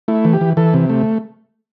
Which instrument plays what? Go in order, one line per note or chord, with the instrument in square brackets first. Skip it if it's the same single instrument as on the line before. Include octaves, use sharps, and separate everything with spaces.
[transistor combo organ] A3 E4
E3
G4
E3
E3 A4
C3
A3